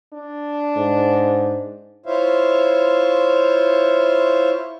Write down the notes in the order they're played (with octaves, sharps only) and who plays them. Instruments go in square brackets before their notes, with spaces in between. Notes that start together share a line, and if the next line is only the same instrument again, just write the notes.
[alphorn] D4
[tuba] G#2
[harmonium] E4 F4 C5 C#5 E5 F5